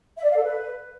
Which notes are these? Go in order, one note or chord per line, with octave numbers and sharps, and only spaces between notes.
E5
D5
F5
A4
B4